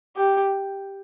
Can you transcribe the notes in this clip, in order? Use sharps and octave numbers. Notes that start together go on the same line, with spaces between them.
G4